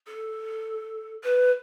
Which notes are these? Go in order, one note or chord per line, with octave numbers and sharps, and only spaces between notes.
A4
B4